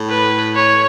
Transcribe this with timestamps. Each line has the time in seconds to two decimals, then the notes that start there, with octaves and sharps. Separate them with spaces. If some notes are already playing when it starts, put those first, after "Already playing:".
Already playing: A2
0.10 B4
0.55 C#5